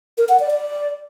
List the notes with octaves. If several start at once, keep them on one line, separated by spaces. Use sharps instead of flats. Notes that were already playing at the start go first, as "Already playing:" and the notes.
A#4
F#5
D5
D5